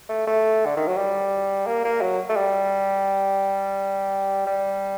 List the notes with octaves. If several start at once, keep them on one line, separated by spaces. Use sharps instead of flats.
A3
A3
D3
D#3
F#3
G3
A#3
A#3
F#3
A3
G3
G3